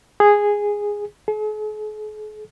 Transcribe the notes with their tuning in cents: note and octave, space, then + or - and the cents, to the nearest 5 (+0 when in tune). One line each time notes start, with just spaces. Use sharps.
G#4 -10
G#4 +45